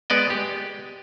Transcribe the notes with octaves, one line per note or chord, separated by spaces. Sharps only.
G#3 B3 D5 D#5
G4